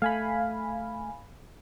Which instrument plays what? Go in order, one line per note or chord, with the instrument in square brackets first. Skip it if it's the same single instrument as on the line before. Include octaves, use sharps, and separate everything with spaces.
[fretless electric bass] A3 [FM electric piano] F5 G#5 B5